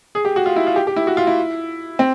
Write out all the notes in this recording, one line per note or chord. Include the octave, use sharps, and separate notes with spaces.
G#4
G4
F#4
F4
E4
F4
G4
G4
E4
F#4
F4
E4
C4